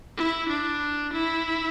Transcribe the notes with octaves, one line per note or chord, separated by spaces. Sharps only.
E4
D4
E4